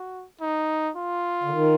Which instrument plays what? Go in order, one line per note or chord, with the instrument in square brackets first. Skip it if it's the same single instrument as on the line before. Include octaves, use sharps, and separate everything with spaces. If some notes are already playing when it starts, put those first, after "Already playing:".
Already playing: [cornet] F#4
D#4
F4
[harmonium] D3
D#3